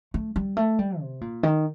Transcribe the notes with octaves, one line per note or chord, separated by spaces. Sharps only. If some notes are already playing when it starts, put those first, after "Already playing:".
A3
G3
A3
G3
C3
A#2
D#3